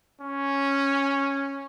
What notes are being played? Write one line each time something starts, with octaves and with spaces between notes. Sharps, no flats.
C#4